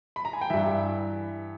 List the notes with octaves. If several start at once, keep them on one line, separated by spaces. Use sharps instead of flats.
B5
A#5
G#5
G5
G2 E3 E4 E5